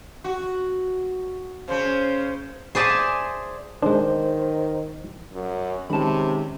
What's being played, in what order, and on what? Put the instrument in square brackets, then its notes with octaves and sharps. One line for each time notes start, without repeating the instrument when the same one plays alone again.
[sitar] F#4
[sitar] C#3 C#4 [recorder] C5
[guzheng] G#4 C5 D5 E5 G#5 A5
[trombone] D#3 [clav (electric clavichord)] G#3 D4 [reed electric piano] C5
[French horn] F#2
[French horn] C3 [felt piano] D#3 G#3 C#4 [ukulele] A5 B5